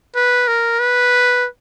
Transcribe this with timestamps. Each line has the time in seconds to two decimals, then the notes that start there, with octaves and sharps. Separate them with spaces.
0.15 B4
0.48 A#4
0.80 B4